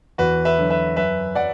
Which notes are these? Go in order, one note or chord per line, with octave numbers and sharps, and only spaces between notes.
E2 F#4 B4
B4 E5
D3 F#3
B4 E5
F#2 B4 E5
F#3 D5 F#5